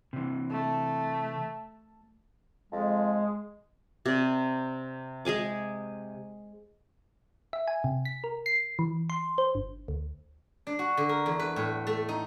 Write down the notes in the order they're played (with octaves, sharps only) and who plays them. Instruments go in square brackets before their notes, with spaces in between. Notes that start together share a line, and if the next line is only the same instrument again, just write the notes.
[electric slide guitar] C3 E3
[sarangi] A3
[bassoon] F2 [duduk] G#3
[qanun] C3 D5
G#3 G#4 G#5 D6
[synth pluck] E5
G#5
C3
B6
A#4
C7
E3
C6
C5
G1
D2
[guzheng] D4
F#4
D3
A#4
E2
B4
A2
A3
D#4